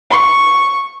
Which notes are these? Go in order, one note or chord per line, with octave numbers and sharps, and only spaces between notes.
C#6